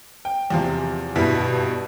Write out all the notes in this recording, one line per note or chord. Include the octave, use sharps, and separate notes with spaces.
G5
E2 C3 F3
G2 B2 E4 B6